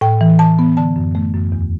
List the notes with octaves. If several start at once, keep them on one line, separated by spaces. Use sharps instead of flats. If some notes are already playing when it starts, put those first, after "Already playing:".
A2 G5
E3
E3 A5
B3
D3 A5
F#2
A3
F#2
E2